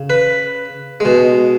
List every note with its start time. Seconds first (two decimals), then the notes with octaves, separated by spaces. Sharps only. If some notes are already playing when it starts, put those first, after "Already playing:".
Already playing: C#3
0.10 B4
1.00 B2 G#3